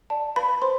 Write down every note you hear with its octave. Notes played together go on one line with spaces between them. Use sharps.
D5 A5
B4 F5 B5
C5 C6